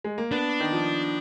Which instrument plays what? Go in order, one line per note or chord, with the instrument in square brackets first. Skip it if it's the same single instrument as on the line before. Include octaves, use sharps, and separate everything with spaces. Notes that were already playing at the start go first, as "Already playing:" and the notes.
[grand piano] G#3
A#3
[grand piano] B3 [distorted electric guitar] D4
[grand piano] D#3
F3